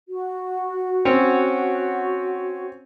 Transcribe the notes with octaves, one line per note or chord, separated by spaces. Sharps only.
F#4
C4 C#4 C#5